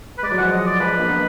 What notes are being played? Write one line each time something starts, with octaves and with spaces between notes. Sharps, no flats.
B4
G#3 D5
F#3
F3 G#3 F#5
D#5
D5
F3 G#3 B4
A#3 D4
B3 D#4